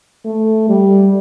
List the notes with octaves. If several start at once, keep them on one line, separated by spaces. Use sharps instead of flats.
A3
G3